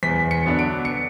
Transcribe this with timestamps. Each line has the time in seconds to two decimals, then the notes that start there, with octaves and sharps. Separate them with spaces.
0.03 E2 B6
0.31 C#7
0.45 D3 F#3 B3 D4
0.59 D7
0.85 C#7